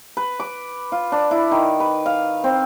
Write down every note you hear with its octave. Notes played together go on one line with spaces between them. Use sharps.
B4
D6
F4
D4
E4
D#3
B4
F5
C4